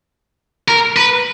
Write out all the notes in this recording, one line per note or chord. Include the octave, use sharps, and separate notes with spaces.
A#4
B4